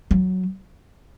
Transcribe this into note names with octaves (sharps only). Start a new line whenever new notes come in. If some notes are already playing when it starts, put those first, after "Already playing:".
F#3